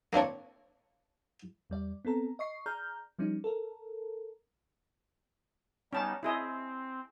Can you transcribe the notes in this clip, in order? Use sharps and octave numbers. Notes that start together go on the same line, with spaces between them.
A#3 C4 D4 C#5
E2 G3 D5
B3 C4 A4 A#5
D#5 C#6 C7
G#4 D5 A#5 F6 G6
F3 G3 C#4 D#4
A4 A#4
G3 B3 C#4 D#4 A5
C4 E4 G#4 D#5